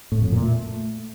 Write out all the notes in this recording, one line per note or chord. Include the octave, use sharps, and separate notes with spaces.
A2
F2
A#2
A3